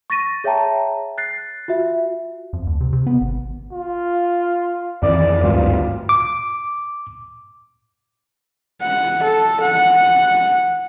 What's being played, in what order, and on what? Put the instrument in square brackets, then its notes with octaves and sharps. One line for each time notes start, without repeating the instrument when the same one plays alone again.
[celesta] C#6 A6 A#6 D#7
G#4 C#5 E5 G5 A5 A#5
F#6 A6 C7
F4 F#4 E5
[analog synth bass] F2
D2
C3
C3
B3
G#1
[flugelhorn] F4
[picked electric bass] F2 D#3 E3 [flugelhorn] D5
[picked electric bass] G#1 D2 G2 [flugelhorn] F4
[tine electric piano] D6
[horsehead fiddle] F#5
A4
F#5